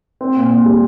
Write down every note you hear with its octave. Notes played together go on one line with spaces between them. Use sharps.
C4
A#2
A#2
G3